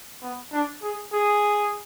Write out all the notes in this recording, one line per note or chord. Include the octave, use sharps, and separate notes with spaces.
B3
D4
G#4
G#4